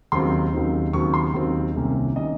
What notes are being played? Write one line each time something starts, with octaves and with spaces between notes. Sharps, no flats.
D#2 C#3 F#3 C4 D#4 C6
D#2 C#3 F#3 C4 D#4
D#2 C#3 F#3 C4 D#4 C#6
C6
D#2 C#3 F#3 C4 D#4
C2 C3 D#3 A#3 C#4
C3 D#3 A#3 C#4 D#5